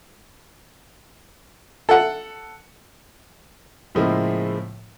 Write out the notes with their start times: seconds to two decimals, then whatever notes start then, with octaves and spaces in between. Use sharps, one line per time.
1.89 A4 F#5
3.95 A2 C#3 F3 G#3 A#3 E4